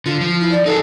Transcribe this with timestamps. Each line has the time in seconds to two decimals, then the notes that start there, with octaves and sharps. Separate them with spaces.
0.06 D3 F4
0.21 F3
0.40 E4
0.51 D5
0.66 D#4 F#4 G#4 A4